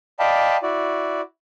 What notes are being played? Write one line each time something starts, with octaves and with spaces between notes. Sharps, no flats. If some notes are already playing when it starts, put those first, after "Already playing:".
D5 D#5 F5 G5 A5 B5
E4 F#4 D5